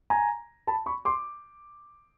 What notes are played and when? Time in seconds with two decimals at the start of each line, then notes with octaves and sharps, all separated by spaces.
0.10 G#5 A#5
0.67 A5 B5
0.86 B5 C#6
1.05 C6 D6